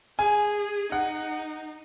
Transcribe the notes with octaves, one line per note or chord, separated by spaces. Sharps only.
G#4 G#5
D#4 F#5